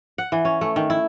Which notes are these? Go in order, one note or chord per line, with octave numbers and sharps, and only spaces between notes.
F#5
E3
C#4
A3
D#3
E4